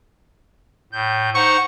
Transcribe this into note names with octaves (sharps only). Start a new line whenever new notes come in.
A2 G6
D#4 C5 F#5 C#6